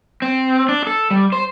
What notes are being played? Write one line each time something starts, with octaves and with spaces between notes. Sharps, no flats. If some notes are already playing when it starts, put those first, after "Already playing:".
C4
D4
A4
G3
C5